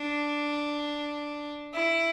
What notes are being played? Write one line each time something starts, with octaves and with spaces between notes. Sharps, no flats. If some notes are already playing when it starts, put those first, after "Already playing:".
Already playing: D4
E4